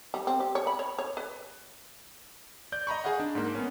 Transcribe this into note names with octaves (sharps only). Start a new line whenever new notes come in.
G3
C4
G4
C#5
B5
C#5
C#5
B4
D5 G6
D#5 A#5 B5 C#6
G#4 D#5 F5 F#5
D4
G#2 A#3
B3 C#4